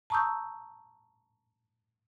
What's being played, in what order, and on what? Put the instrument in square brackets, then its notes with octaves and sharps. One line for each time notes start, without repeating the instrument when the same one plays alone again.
[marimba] A5 A#5 C#6 D#6 E6 G6